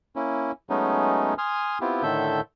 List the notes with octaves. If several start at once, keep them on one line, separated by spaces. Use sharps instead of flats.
A#3 C#4 E4
F#3 G#3 A3 B3 C#4 D#4
G#5 C6 D#6 F6
B3 C4 E4 F4 G4
A2 D3 D#3 A4 E5 G6